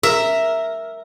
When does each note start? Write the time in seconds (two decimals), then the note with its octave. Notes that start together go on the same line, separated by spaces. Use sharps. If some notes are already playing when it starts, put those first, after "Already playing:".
0.03 A#4 E5